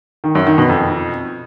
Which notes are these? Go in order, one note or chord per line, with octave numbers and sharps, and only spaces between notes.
D#3
F#2
D#3
B2
F2